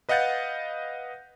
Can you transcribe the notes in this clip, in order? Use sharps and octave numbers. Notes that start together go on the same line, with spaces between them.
B4 D#5 F5 F#5 G6 A6